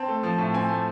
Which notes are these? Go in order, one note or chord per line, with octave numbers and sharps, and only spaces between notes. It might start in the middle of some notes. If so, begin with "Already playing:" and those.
Already playing: C4 A5
A3
F3
A2
C4 G#5
A3